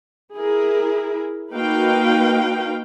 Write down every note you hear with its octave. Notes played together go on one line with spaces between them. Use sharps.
E4 G#4 A#4
A#3 D#4 F#4 B4 F5 G5